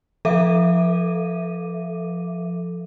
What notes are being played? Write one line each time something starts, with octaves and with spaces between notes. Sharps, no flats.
F3 A4 E5 F5 D6 D#7